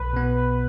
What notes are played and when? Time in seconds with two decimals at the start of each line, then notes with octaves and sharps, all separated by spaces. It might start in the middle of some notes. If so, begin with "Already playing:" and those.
Already playing: B1 B4
0.13 B2 B3